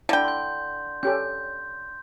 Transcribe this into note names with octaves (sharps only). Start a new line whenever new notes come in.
D3 D4 E4 G5
C6 G6
C#4 G4 A4 G6